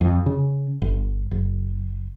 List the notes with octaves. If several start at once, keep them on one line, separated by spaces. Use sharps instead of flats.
F2
C#3
G1
F#1